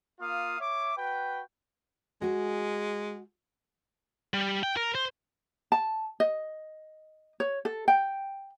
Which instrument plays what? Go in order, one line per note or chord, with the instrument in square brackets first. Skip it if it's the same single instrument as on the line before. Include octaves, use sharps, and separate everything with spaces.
[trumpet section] A#3 F4 F5 D#6
C#5 E5 D6
F#4 B4 G5
[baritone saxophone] G#3 [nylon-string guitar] F#4 G#4
[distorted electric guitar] G3
G5
A#4
C5
[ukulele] A5
D#5
C#5
A4
G5